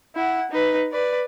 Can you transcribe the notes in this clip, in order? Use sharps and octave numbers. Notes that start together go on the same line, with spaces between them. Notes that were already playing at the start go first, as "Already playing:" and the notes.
E4 F#5
D#4 B4
B4 D5